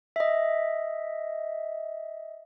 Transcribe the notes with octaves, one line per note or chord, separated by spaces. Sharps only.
D#5 E5